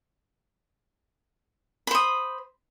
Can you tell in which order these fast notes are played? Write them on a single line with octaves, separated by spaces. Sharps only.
B5 C5 D#6